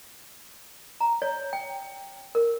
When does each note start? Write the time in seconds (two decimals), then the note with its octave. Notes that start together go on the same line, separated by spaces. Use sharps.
1.01 A#5
1.22 C#5
1.53 G5
2.35 A#4